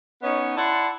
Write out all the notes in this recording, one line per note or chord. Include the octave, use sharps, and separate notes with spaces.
B3 C#4 D#4 C#5 D#5
E4 D5 F#5 A5 C6